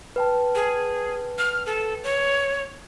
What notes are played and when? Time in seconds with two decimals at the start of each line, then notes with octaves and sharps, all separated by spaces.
0.16 B4 G5 A5
0.55 G#4
1.38 F6
1.66 A4
2.04 C#5